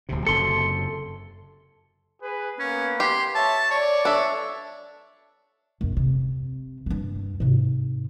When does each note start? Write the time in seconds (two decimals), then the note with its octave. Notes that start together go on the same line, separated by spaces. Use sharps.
0.09 D1 D2 C3
0.27 F#1 F#2 C3 A4 C6 C#7
2.22 G#4 B4
2.59 A#3 B3 C#4 B4
3.00 G4 C6
3.35 C#5 E5 A5
3.71 C#5 D5
4.05 D4 A4 E5
5.81 A#1 F#2
5.97 C3
6.86 G2 A#3
7.40 G#2 C3